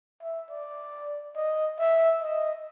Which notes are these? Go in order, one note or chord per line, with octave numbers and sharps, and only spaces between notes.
E5
D5
D#5
E5
D#5